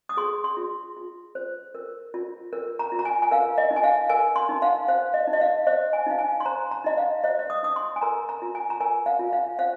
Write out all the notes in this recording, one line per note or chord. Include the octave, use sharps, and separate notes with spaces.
D#6
G#4 C6
C6
F4
F4
C5
A#4
F4
A#4
A#5
F4
A#5
G#5
G#5
A#4 F5
D#5
D#4
G#5
F5
A#4 G#5
C6
D#4
F5
C5 F5
D#5
D#4
D#5
F5
C5 D#5
G#5
D#4 F5
G#5
C6
C5 A#5
A#5
D#4 D#5
F5
C5 D#5
D#5
D#6
D#4 D#6
C6
G#5
A#4 A#5
A#5
F4
G#5
A#5
A#4 G#5
F5
F4
F5
C5 F5